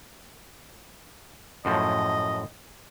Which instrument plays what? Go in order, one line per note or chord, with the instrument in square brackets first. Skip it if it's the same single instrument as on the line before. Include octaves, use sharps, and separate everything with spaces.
[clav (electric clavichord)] F#2 A2 F3 [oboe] D#5